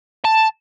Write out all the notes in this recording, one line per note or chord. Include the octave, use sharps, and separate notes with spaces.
A5